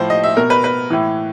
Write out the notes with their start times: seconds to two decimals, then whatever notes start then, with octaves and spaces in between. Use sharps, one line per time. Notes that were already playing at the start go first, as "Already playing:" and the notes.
Already playing: A2 F3 C5
0.10 D#5
0.23 E5
0.37 B2 A#4
0.50 B4
0.64 B4
0.90 A2 E3